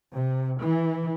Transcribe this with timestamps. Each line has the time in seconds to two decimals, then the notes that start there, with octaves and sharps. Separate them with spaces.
0.12 C3
0.60 E3